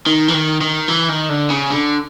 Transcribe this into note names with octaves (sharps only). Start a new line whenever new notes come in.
D#3
E3
D#3
D#3
E3
D#3
D3
C#3
D3